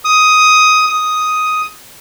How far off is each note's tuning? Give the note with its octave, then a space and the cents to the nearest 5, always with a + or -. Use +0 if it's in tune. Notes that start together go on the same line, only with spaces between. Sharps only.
D#6 +10
D#6 +5